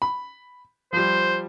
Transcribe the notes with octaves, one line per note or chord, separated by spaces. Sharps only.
B5
F3 G3 C5